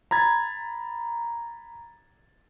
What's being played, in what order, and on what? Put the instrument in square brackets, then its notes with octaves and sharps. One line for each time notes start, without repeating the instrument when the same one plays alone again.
[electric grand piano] A#5 B5 G#6 A6